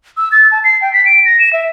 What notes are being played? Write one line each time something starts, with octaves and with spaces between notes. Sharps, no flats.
E6
A6
A5
C7
G5
B6
D7
A#6
E7
E5